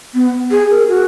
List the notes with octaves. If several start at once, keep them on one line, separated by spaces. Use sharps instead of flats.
B3
G#4
A#4
F#4